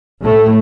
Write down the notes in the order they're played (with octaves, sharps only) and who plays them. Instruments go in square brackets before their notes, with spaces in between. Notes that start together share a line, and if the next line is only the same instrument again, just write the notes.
[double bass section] A2 A3